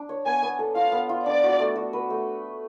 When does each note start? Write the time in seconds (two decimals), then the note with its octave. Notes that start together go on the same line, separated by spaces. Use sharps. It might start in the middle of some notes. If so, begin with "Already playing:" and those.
Already playing: D4
0.09 C#5
0.26 B3 G#5
0.42 B3
0.59 A4
0.75 F4 F5
0.92 B3
1.09 F4
1.26 D4 D5
1.43 F#4
1.59 A3
1.76 F#4
1.93 B4
2.10 A3